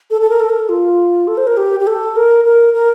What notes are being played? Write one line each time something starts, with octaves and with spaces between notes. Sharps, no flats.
A4
A4
A#4
A4
A#4
A4
F4
A4
C5
A#4
G4
G4
A4
A#4
A#4
A#4